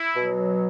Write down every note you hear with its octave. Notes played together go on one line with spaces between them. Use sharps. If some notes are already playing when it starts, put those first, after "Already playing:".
Already playing: E4
B2 F#3